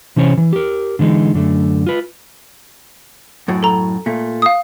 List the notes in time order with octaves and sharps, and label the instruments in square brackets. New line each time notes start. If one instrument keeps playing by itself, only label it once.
[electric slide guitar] C3 E3 C#4 C5 C#5
E3
G4 A#4
D3 E3 G#3 D#4
F#2 D3 A3
F4 B4
[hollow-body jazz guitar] F#2 A2 F#4
[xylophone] A4 A#5
[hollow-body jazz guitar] A#2 A3
[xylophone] F5 D#6